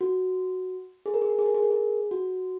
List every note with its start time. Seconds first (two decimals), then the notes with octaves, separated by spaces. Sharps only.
0.01 F#4
1.06 G#4
1.14 A#4
1.22 G#4
1.30 A#4
1.39 G#4
1.46 A#4
1.55 G#4
1.63 A#4
1.70 G#4
2.11 F#4